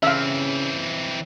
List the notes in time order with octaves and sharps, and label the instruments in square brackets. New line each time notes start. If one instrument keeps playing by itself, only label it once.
[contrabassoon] C#3 [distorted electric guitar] E3 C4 [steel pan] E5 F5